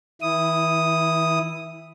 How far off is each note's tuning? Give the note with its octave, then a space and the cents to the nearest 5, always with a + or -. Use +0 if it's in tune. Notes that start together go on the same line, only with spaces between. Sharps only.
E3 -35 E4 +0 D#6 +0